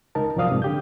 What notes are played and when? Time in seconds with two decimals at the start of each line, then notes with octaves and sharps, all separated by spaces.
0.15 C#2 D#4 A#4 A5
0.36 C2 F#2 F3 D5 F5 D#6
0.49 G#2 C3
0.62 D3 G4 G6